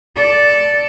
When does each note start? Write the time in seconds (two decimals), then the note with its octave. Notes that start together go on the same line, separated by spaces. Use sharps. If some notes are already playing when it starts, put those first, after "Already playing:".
0.16 A4 D5